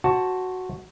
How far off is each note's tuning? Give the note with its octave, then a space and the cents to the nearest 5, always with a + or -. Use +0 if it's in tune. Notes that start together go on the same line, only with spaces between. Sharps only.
F#4 +0 C5 +20 A5 +0